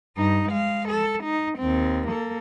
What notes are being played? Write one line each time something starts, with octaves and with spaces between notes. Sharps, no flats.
G2 D#4
G#3 F5
A4
D#4
D#2 C4
A#3 A4